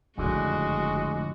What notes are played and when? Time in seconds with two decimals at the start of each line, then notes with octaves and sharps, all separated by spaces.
0.18 F#1 F2 A2 D3 G#3 F#4